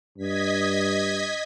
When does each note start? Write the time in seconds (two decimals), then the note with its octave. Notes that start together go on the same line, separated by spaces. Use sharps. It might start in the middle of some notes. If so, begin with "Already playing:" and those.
0.18 G2 D#5 G#6 B6